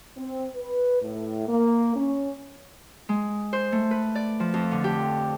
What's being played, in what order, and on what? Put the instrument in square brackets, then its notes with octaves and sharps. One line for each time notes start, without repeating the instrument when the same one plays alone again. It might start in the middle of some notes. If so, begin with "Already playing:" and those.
[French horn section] C4
B4
A2
A#3
C#4
[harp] G#3
C5
A3
B4
D5
F3
F2
D3
G4